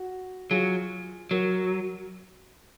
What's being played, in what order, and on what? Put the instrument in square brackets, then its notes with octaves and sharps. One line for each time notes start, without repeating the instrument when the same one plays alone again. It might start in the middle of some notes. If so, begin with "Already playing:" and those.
Already playing: [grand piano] F#4
[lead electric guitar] F#3 [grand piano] F4 G#4
[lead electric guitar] F#3 [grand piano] F#4 A#4